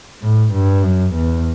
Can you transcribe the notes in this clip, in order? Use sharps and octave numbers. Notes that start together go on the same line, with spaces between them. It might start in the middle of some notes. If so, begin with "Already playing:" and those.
A2
G2
F#2
E2